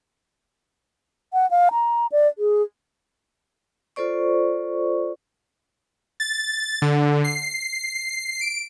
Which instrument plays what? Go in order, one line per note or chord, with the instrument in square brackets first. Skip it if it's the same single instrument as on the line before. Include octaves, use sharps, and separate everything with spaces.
[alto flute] F#5
F5
A#5
D5
G#4
[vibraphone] F4 A4 C5 D5 C#6
[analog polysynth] A6
D3
C7
D7